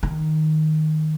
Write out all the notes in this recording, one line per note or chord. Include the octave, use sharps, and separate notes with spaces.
D#3